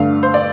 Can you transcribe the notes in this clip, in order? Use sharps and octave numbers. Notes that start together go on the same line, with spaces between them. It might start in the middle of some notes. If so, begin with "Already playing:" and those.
Already playing: G2 D3 A3 D4 F5
C5
D5